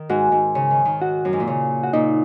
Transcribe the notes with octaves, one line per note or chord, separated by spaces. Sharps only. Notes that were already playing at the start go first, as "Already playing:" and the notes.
Already playing: D#3
G#2 F#4
G#2
C#3
D#3
D#3
F#4
F#2
G#2
A#2
C#3
F#4
A#2 D#4